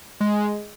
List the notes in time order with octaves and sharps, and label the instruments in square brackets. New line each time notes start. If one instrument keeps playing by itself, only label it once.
[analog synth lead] G#3